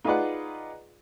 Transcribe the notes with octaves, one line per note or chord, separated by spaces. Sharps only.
D#4 F4 G#4 B4 D5 F#5